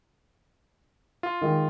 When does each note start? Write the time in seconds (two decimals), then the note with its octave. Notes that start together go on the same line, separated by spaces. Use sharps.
1.23 F4
1.41 D#3 G#3